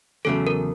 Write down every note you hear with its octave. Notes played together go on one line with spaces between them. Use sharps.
E2 C#3 F#3 A3 A4
A#4